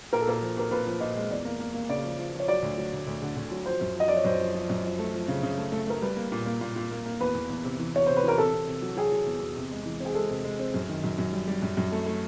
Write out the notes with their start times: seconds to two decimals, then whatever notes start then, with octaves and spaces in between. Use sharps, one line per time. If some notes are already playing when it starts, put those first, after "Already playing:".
0.13 A#2 A#4
0.21 A4
0.27 A#2 A#4
0.42 F3
0.57 A#2 A#4
0.71 A#2 B4
0.86 F3
1.00 A#2 D#5
1.16 G#3
1.30 E2 D5
1.45 A#3
1.60 A#3
1.74 A#3
1.89 C#3 D5
2.04 F3
2.19 F3
2.34 F3
2.40 C#5
2.48 F#3 D5
2.62 D2
2.78 F#3
2.93 D2
3.07 D2
3.22 D3
3.36 D3
3.51 F#3
3.66 F3 C5
3.81 F#2
3.96 F3 D#5
4.08 F3 D5
4.16 C#5
4.25 F#2 C5
4.40 F3
4.55 F3
4.70 F#2
4.84 F3
4.99 A3
5.13 F3
5.28 C#3
5.43 C#3
5.58 A3
5.72 A3
5.87 A3 A#4
6.02 G3 B4
6.17 A#3
6.32 A#2
6.46 A#3
6.61 A#2
6.76 A#2
6.91 A#3
7.06 A#3
7.20 E2 B4
7.35 E2
7.50 E2
7.64 C3
7.79 E3
7.94 E2 C#5
8.06 C3 C5
8.17 B4
8.23 E3
8.28 A#4
8.38 C3 A4
8.53 C3
8.67 C3
8.82 F#3
8.97 F#3 G#4
9.12 F#3
9.26 E2
9.41 E2
9.57 C3
9.71 G#3
9.86 E3
10.00 C4 G#4
10.15 G#3 A4
10.30 C3
10.45 G#3
10.59 C4
10.74 F#2
10.89 D#3
11.04 F#2
11.18 F#2
11.33 G3
11.48 G3
11.63 F#2
11.77 F#2
11.92 A3
12.06 A3